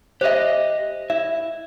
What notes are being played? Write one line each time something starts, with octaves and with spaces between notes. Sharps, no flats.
G4 C5 D#5 E5
E4 E5